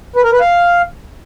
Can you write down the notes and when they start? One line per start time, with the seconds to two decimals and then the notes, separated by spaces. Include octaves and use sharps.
0.16 B4
0.24 A#4
0.32 B4
0.40 F5